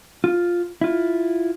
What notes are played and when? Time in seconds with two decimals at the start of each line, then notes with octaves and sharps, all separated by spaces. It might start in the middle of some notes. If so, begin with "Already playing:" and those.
0.24 F4
0.81 E4 F4